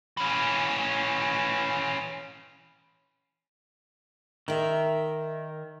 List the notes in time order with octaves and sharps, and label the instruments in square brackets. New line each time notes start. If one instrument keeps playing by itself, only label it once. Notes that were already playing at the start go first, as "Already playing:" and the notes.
[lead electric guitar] E3 C#4
[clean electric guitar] D#3 [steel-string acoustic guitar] A#4 E5